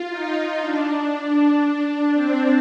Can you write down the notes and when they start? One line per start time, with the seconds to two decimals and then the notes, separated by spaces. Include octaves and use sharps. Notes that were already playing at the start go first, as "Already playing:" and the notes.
Already playing: F4
0.09 D#4
0.60 D4
2.13 C4